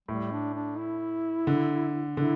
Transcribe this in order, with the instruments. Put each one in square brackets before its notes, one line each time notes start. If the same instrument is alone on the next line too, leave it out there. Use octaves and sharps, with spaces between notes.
[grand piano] A2 [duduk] G3
[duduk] D4
D4
E4
[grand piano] D3
[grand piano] D3 [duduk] E4